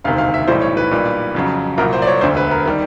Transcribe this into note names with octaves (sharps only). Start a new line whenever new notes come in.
E1 D2 C3 D#3 F5
F5
E5
B1 A2 E3 G3 C5
C#5
B4
B1 A#2 G3
F2 C#3 F#3
C2 A#2 F#3 A#4
C5
D5
C#5
E1 D2 D3 C5
B4
A#4
D#3 G3 A#4